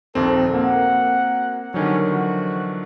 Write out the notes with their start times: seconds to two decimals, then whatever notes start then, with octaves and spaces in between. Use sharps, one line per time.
0.15 A#1 D#2 C4 A4
0.54 A#3 C4 F#4 A#4 F#5
1.74 D3 D#3 F#3 G3 C4 C#4
2.11 E3 F3 F#4